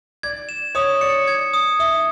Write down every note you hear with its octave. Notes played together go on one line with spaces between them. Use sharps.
D5 G#6
E7
C#5 D#6
D5 C#7
G#6
D#6
E5 D#6